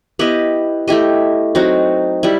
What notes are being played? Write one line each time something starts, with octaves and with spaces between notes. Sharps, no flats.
B3 E4 G4 D#5
A3 E4 G4 D#5
F#3 C4 D#4 F#4
G3 E4